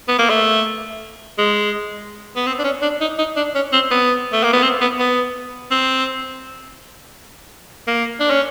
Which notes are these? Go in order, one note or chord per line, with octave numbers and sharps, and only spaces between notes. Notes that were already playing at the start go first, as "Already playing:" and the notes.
B3
A#3
A3
G#3
B3
C4
D4
C#4
D4
D#4
D#4
D4
C#4
C4
B3
A3
A#3
B3
C4
B3
B3
C4
A#3
D4
C#4